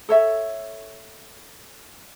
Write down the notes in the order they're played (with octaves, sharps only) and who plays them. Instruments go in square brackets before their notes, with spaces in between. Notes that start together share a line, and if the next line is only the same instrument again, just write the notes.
[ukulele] A4 C#5 E5